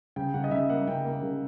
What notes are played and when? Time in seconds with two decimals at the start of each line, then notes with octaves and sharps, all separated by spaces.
0.16 C#3 G5
0.34 C#3 F#5
0.44 D#5
0.51 C#3 E5
0.69 A#3 F#5
0.87 C#3 G5
1.05 A#3
1.22 C#3